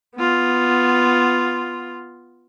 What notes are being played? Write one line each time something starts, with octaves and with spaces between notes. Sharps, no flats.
B3 F4